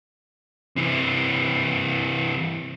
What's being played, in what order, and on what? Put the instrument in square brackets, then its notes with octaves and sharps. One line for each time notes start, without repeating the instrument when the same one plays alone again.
[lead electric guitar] C3 E3